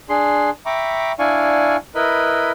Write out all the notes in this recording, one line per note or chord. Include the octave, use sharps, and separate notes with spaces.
D4 G#4 C6
E5 G5 A#5 B5 C#6 D6
D4 E4 D5 F5 G#5 C#6
E4 A#4 B4 D#5 B5